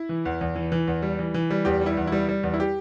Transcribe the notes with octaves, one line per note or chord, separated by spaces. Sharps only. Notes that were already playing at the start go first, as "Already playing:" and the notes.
Already playing: E4
E3
E2
E2
E3
E3
E2
G3
E3
E3
G3
E2 G4
G3 E4
E2
G3 E4
G3
E2
E4
G4